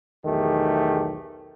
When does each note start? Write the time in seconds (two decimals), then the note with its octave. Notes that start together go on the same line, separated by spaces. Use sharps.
0.25 B1 E2 D#3 A3 G4 G#4